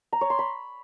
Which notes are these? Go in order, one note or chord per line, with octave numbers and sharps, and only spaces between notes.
A#5
C#5
C6
B5